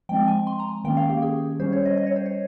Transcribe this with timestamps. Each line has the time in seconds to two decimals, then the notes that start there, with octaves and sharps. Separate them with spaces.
0.09 F3 G#3 C4 G5
0.28 G#5
0.47 C6
0.60 A#5
0.84 D#3 A#3 C#4 G5
0.97 F5
1.10 G4
1.22 G#4
1.60 G3 C#4 C5
1.73 C#5
1.85 D#5
1.97 D#5
2.07 C#5
2.16 C5
2.26 C#5